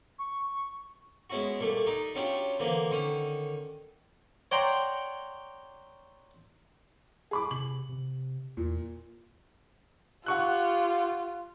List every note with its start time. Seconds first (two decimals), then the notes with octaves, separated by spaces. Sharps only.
0.19 C#6
1.30 G#3 B3 C#4 E4 F#4
1.60 A#2 G3 A3
1.87 D#4 D5 E5
2.15 F#3 C#4 D4 F4 G4 C#5
2.59 D3 E3 F3 A#3
2.91 D3 D#3 C#4
4.51 C#5 D5 F#5 G5 A#5 C6
7.31 G#4 B5 D6
7.51 C3 F#7
7.89 C3
8.57 E2 A#2
10.26 F4 G4 F#5 C#6 F#6